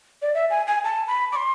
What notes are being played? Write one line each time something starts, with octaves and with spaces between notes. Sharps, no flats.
D5
E5
G#5
G#5
A5
B5
D6
C6